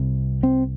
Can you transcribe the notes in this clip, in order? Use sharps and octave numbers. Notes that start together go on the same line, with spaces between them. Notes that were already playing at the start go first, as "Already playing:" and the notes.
Already playing: C2 C3
C4